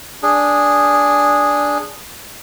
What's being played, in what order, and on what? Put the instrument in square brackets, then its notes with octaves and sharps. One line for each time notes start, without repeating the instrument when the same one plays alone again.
[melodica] D4 G#4